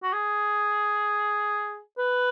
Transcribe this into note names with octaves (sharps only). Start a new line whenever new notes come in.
F#4
G#4
B4